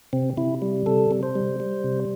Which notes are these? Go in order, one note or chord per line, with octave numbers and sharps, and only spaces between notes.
C3 C4
C3 E4
G3
C3 A4
C3
C5
G3
G3
C3